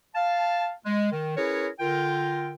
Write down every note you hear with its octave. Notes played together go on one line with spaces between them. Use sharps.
F5 A5
G#3
D#3
C#4 E4 G#4 A#4 B4 C#5
D3 F4 A#4 G5